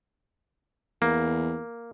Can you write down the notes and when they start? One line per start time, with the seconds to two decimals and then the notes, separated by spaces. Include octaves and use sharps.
1.02 E2 A#3